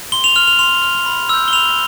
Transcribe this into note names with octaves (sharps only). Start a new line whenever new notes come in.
C6 G7
F7
F6 F7
F7
C6 F7
F6
B5
E6 G6
G7
B5 F7